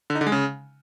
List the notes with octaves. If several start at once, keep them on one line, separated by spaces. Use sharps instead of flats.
D3
D#4
D3
G#3
C#3